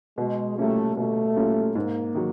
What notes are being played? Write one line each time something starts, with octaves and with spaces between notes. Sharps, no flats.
B2 G#3
G3 A3 A#3 C#4 F4
B2 A3
G3 A#3 C#4 F4
G#2 A#3
D#3 F#3